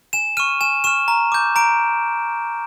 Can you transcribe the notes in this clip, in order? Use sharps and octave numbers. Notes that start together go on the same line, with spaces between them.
G#5 E7
C#6 F6 D#7
G#5 E7
C#6 F6 E7
A#5
D6 G6
A#5 D7